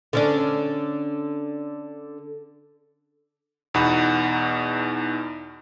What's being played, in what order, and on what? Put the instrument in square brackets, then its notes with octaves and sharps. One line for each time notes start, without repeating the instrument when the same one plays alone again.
[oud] D3 C#4 D4
[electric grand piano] E2 B2 D#4 F#5 B5